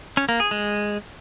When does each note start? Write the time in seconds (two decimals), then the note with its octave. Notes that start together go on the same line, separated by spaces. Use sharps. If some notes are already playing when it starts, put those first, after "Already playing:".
0.17 C#4
0.29 A#3
0.40 G#4
0.51 G#3